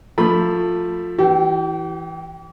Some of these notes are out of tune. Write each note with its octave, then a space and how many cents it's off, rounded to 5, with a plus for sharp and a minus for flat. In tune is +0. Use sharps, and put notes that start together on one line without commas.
F3 +15 A3 +15 B5 +0
E3 -5 G4 -40 G5 +0